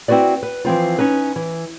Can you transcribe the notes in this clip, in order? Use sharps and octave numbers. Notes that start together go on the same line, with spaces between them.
C4 E4 F#4 B4 D5
B4
E3 F3 C4 F4
C#4 D#4 B4
E3